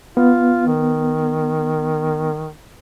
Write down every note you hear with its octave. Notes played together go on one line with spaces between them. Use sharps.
B3 F4
D#3